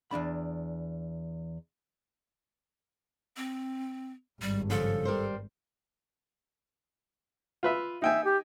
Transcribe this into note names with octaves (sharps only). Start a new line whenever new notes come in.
E2 G#2 D4 B5
C4
G#1 G2 G3
C#3 F3 A4
G3 A#4 C5
F4 B4 E5
D#4 E5 G5 G#5
G4